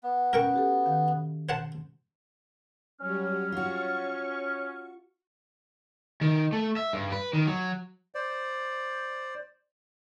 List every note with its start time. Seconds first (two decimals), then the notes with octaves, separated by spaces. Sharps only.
0.03 B3
0.33 C#4 A#4 G5 C#6
0.54 F#4 G4 A4
0.86 D#3 F5
1.49 C5 F#5 A5
3.00 F#3 G3 C#4 F6
3.52 F4 F#4 C#6
6.21 D#3
6.53 A3
6.76 E5
6.93 G2
7.12 B4
7.33 D#3
7.47 F#3
8.15 C5 D5